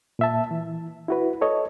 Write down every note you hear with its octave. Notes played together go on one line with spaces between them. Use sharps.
A#2 E5 A5
E3
E4 F#4 B4
A4 C#5 D#5